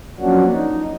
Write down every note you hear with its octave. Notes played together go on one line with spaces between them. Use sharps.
F3 F#3 A#3 C#4 D4 F#4
D#4